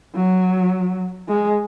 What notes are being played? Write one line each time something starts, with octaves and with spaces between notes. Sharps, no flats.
F#3
G#3